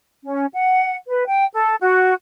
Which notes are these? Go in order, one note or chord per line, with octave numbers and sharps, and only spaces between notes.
C#4
F#5
B4
G5
A4
F#4